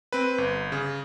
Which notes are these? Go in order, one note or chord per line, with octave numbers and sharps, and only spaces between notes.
C4 B4
G1
C#3